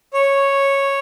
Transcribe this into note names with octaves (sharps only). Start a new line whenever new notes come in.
C#5